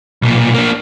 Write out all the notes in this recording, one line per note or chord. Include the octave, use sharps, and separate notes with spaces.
B1 A#2
A#3 D4